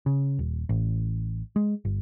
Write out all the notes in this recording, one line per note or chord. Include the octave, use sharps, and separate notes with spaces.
C#3
D#1
A1
G#3
G1